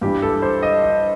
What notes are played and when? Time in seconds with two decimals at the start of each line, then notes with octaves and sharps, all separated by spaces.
0.01 G2 E3 G3 G4
0.22 A4
0.42 C5
0.63 D#5
0.83 D#5